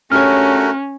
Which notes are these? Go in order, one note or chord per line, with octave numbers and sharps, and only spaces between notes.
A3 C#4 D4 F#4 G4 A#4 C#5 F6